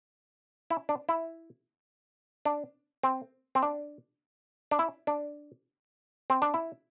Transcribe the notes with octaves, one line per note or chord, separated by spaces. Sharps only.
E4
D4
E4
D4
C4
C4
D4
D4
E4
D4
C4
D4
E4